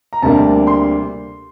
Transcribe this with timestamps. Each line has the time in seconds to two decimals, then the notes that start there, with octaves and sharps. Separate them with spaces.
0.13 A#5
0.22 D2 C3 G3 A#3 D4 A5
0.67 C6